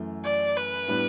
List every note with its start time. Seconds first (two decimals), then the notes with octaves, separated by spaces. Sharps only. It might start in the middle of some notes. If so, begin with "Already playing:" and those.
Already playing: F#2 E3 A3
0.24 D5
0.57 B4
0.88 A2 G3 B3 D4